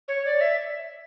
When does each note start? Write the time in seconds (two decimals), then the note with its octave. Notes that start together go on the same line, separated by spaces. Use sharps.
0.08 C#5
0.25 D5
0.41 E5